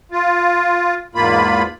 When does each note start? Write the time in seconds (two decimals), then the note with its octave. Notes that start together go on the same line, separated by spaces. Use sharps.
0.12 F4
1.15 E2 G#2 A#3 F4 B5